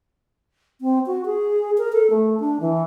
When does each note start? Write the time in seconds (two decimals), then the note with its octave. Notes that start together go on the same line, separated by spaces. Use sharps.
0.81 C4
1.07 F#4
1.26 G#4
1.78 A#4
1.93 A4
2.10 A3
2.40 D4
2.60 E3